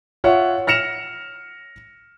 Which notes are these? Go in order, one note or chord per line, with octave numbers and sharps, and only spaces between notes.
F4 C#5 E5 F#5
F6 A#6 C#7 E7 F7